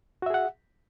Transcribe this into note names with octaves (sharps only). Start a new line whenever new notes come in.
F#4 G#4 E5 F#5